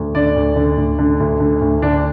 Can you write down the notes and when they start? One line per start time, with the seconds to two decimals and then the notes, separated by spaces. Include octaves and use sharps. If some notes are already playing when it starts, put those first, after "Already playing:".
Already playing: D2
0.15 D3 D5
0.36 D2
0.56 D3
0.77 D2
0.99 D3
1.20 D2
1.40 D3
1.61 D2
1.82 D3 D4